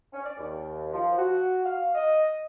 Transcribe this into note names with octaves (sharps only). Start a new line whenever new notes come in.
C#4
D5
D#2
F3
F#4
F5
D#5